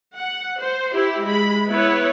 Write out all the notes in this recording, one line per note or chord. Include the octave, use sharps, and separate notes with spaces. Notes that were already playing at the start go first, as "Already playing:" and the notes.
F#5
C5
E4 G4
G#3 B5
B3 E4 B4 C#5